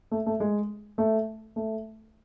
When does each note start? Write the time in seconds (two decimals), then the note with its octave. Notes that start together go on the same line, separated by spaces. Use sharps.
0.11 A3
0.26 A3
0.40 G#3
0.98 A3
1.56 A3